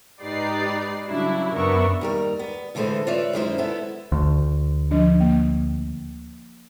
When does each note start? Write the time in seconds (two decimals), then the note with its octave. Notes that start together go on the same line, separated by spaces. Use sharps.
0.20 G#2 D#4 G4 B4 D5 C7
1.07 C#3 F#3 G3 D4 E4
1.54 F#2 B3 D4 A#4 E5 C#6
2.01 D#2 G3 A#4
2.39 B3
2.75 A2 D3 E3 G#3 A4 C5
3.07 F4 B4 C#5 D5 E5
3.33 F#2 D#3 G#3 C#4 E4 C5
3.58 B3 E4 A4
4.12 D2
4.91 F3 D4
5.20 A#3